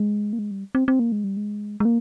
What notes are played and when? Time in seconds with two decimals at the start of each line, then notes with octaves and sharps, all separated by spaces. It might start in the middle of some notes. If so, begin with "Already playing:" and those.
Already playing: G#3
0.33 A#3
0.39 G#3
0.51 G3
0.75 C4
0.88 C4
0.99 A#3
1.12 G#3
1.24 G3
1.37 G#3
1.80 G#3
1.85 A#3